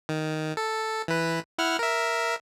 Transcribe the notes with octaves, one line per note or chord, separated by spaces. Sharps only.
D#3
A4
E3 B4
E4 F#5 F6
A#4 E5